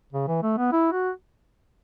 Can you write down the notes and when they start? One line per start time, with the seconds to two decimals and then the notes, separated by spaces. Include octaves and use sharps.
0.13 C#3
0.28 E3
0.43 A3
0.58 B3
0.72 E4
0.92 F#4